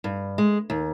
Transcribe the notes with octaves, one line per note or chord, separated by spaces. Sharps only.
G2
G#3
D#2